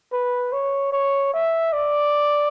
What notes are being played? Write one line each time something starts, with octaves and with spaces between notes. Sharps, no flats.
B4
C#5
C#5
E5
D5